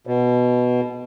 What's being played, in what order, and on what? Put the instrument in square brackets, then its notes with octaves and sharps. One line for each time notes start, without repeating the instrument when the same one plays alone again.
[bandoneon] B2